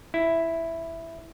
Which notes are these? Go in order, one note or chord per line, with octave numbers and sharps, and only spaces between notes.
E4